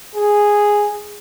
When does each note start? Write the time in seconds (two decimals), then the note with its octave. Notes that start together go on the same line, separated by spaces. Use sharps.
0.15 G#4